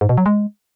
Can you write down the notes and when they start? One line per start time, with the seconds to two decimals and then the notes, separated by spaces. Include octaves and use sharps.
0.01 G#2
0.09 B2
0.18 F#3
0.26 G#3